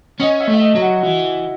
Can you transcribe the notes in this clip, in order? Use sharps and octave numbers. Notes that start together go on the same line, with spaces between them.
C#4 D#5
E5
A3
E5
D#5
F#3
F#4
E3 E4